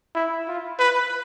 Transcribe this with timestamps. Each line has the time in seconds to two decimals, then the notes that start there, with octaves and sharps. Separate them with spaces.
0.15 E4
0.48 F4
0.79 B4